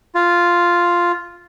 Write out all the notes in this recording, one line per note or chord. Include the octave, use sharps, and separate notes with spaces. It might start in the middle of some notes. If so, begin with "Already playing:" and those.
F4